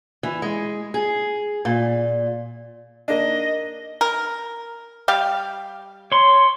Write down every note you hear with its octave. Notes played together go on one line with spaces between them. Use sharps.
E3
G#3
G#4
A#2
A#3 D4 D#5
A#4
G3 G4 F5
C#5 C6